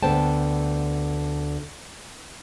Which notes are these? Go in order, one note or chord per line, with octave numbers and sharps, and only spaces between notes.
D2 D3 B3 C5 G5 A5